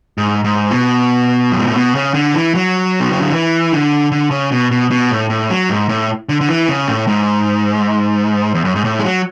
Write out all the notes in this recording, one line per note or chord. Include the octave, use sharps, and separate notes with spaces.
G#2
G#2
B2
F#2
G#2
A2
B2
C#3
D3
E3
F#3
B2
C#3
D3
E3
D3
D3
C#3
B2
B2
B2
A2
A2
F#3
G#2
A2
D3
D3
E3
C#3
A2
G#2
E2
F#2
G#2
A2
G#3
F#3